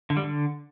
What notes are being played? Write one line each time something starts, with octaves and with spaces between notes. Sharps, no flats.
D3
G3
D3